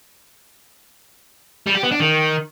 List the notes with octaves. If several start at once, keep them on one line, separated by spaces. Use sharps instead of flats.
G3
G4
B3
D4
D#3